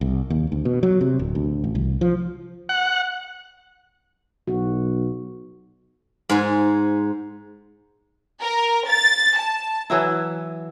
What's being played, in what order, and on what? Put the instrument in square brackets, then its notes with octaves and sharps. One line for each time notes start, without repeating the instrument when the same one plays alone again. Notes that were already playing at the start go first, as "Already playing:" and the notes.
[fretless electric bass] C2
D#2
D2
B2
F#3
C3
D1
D2
A1
C2
F3
[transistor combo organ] F#5
[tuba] B1 [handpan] F#4
[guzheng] G#2 C5 G#5
[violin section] A#4
A6
A5
[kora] E3 F#3 E4